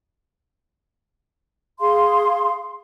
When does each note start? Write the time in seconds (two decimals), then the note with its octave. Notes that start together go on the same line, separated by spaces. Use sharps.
1.80 G#4 F5 C6